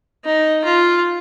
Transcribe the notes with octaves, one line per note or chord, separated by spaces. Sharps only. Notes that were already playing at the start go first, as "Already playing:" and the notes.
D#4
F4